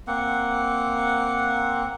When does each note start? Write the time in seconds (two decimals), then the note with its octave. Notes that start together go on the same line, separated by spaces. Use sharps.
0.07 A#3 C4 F#5